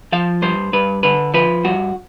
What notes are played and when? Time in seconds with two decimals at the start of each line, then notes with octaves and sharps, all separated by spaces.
0.12 F3 F5
0.42 G2 C5
0.73 G2 B4
1.03 D3 B4
1.34 F3 B4
1.64 G2 F#4